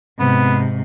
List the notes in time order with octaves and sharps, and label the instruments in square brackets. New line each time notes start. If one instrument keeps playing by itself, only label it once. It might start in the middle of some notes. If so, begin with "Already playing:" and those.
[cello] G#2 C3 [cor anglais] B3